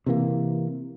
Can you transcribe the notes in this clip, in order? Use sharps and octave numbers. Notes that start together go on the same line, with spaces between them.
C3 E3 A#3